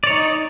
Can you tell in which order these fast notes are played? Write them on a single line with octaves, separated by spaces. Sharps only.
D5 C#5 D#4